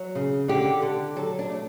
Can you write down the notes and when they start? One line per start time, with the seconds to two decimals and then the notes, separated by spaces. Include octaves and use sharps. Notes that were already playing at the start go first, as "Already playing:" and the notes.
Already playing: F#3
0.15 C#3
0.48 D3 G4
0.82 D3
1.16 F#3 A4
1.39 D4
1.50 A3